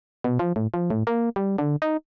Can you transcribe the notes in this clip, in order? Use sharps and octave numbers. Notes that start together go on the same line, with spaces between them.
B2
F3
A2
F3
A2
A#3
G3
D3
D#4